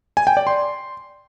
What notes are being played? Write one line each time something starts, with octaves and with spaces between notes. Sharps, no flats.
G#5
G5
D5
C6